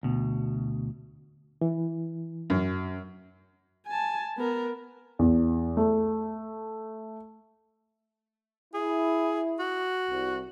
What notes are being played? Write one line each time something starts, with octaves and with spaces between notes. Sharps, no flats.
D2 B2
E3
F#2
G#5 A5
B3 A#4
E2
A3
E4 G#4
F#4
C2